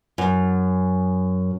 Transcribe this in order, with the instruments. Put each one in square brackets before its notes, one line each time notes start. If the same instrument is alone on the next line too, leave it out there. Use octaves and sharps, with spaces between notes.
[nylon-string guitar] F#2